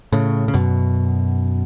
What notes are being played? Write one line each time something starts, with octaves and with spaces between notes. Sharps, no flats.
A2 C#3
C#3
F#2 B2